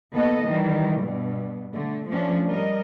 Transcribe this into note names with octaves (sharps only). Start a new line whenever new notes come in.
D#2 B3 A4 D#5
D#3 E3 G3
G2 B2
D3 A3
F3 A3 C#4 D4
G3 A#4 D#5